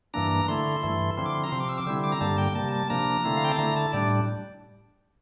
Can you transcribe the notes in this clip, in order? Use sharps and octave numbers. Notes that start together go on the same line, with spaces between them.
G2 E3 A#3 D4 A#5
A#5
D3 A3 E4 C6
G2 E3 A3 E4
D3 F3 C4 E4 C6
D6
C6
A#5
C3 F3 C4 C6
D6
E6
D6
D3 G3 C4 E4 E6
D6
A#5
G2 D3 G3 A#3 A5
G5
C3 G3 A#3 A5
A5
C3 F3 A#3 D4 A#5
D3 A3 C4 E4
F5
G5
A5
D3 A3 E4 A#5
A5
A2 G3 D4 D5